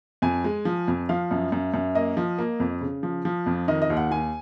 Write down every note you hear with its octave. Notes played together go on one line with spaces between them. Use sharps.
F2 G#5
G#3
F3
F2
F3 F5
F#2
F#2
F#2
A#3 D#5
F3
A#3
F2
C#3
F3
F3
F2
D#3 D#5
D#5
D#2
F#5
D#2 G#5